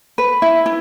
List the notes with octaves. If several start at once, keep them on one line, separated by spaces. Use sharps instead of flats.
B4
E4
E4